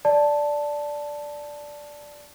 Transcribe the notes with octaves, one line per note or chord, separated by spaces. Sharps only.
D5 A5